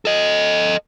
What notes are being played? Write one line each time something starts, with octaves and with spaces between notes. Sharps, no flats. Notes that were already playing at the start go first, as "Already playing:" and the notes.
A4 D#5